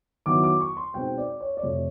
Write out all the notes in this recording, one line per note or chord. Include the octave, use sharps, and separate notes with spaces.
D#3 F#3 B3 E4 D6
D6
C#6
C6
B2 G#3 C4 D#4 G5
D5
C#5
D5
F2 C3 F3 A3 C#5